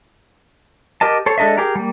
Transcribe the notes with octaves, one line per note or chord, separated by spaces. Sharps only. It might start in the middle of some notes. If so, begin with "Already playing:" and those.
G4 A#4 D#5 A5
A4 C5 C#5
G#3 D4 A4 D#5 E5
G4 G#4 A#4
G3 A#3